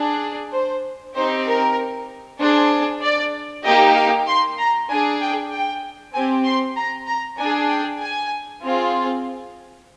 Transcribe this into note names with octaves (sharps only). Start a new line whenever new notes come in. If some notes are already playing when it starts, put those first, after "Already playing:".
Already playing: D4 G#4
C5
C4 D#4 G4 C5
A#4
D4 G#4 C5
D5
A#3 D#4 G4 D#5
F5
C6
A#5
D4 G#4 G#5
G5
G5
C4 G4 G#5
C6
A#5
A#5
D4 G#4 G#5
G5
G#5
C4 F4 G#4